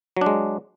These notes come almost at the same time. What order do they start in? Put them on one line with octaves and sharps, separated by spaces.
F#3 D4 G#3